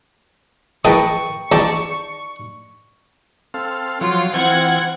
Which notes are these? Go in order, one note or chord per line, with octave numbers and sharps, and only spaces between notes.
E3 G#3 A#4 B4 G5 A5 C#6 D#6
E2 D#4 G4 D5 A5
C4 A4 F5
F3 F#3 F4 C#5
E3 C4 F4 F#5 G#6